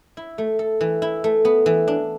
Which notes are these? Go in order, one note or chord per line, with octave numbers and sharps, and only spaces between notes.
E4
A3
A4
E3
E4
A3
B3
E3
D4